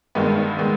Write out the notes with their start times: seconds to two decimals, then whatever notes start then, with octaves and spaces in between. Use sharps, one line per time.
0.15 G2 D#3 G#3 B3
0.59 D#3 G#3 B3